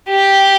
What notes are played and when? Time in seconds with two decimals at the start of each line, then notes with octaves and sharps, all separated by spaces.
0.10 G4